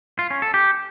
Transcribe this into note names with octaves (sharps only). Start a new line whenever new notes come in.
F4
C#4
A4
G4